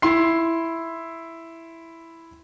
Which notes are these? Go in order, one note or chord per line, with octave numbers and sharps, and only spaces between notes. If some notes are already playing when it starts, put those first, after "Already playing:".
E4 C6 C7